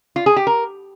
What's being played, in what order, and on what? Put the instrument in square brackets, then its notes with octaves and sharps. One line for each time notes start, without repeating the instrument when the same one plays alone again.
[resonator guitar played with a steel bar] F4
G#4
G4
A#4